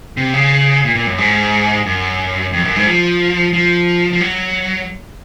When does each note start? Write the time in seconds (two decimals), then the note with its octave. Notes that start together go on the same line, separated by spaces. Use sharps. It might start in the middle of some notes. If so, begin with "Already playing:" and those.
0.17 C3
0.34 C#3
0.85 A#2
0.95 A#2
1.07 F#2
1.18 G#2
1.86 F#2
2.53 F2
2.65 F#2
2.76 G#2
2.87 F3
3.53 F3
4.13 F3
4.21 F#3